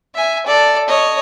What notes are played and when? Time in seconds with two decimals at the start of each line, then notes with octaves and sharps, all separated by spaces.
0.15 E5 G#5
0.46 A4 D5
0.89 C#5 D#5